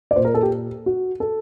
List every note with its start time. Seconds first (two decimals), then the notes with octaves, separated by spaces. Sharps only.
0.11 D5
0.16 A#2 C5
0.25 A#4
0.34 A4
0.43 G4
0.86 F#4
1.20 A4